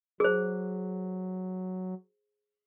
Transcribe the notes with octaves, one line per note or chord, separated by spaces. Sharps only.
F#3 G#4 C5